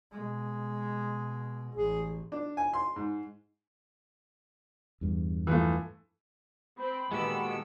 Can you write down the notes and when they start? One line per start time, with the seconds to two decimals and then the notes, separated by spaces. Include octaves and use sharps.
0.12 B2 G#3
1.75 A1 G#4
2.32 D4
2.57 G#5
2.73 C6
2.96 G#2
5.01 E2 G2
5.47 E3 F3 A3
6.78 C4 B5
7.12 A#2 D#3 G#3 B3 F#4 G4 A4 E6